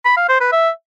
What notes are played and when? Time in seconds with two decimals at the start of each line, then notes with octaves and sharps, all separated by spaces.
0.05 B5
0.17 F5
0.29 C5
0.41 B4
0.52 E5